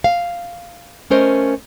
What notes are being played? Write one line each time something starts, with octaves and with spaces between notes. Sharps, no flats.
F5
A3 C#4 A#4 C5 D#5